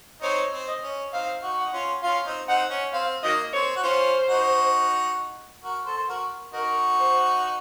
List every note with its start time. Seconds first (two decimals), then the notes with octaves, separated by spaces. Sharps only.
0.22 C4 D#4 C#5
0.53 C4
0.68 D#5
0.83 C#4
1.12 C4 D#4 F5
1.42 D#4 F#4
1.58 F#5
1.65 D#4
1.73 C#4 F4
2.02 C#4 F4 F5
2.25 C4 D#4
2.48 C4 D#4 F#5
2.70 C#4
2.93 C4 F5
3.23 D#3 F#3 A#3 D#5
3.53 C4 C#5
3.76 F#4
3.83 C#4 F4 C5
4.29 D#4 F#4
5.63 F#4 A#4
5.86 A4 C5
5.97 C5
6.09 F#4 A#4
6.54 D#4 F#4 A#4
6.99 C5